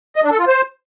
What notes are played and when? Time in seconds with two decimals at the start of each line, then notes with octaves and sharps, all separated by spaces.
0.16 D#5
0.24 D4
0.32 A4
0.39 F4
0.47 C5